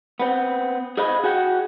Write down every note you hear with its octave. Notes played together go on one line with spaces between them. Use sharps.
B3 C4
G#4 C5 D#5 F5 B5
F#4 G#4 F#5 G5